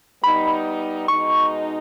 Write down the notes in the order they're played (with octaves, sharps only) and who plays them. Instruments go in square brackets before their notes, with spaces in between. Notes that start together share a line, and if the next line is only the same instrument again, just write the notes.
[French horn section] G3 B3 D#4 [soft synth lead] B5
[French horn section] B2 G#3 D#4 [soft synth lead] C#6